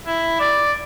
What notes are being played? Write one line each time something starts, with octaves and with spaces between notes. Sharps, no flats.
E4
D5